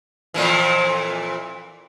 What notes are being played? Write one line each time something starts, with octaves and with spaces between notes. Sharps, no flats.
F2 A#2 E3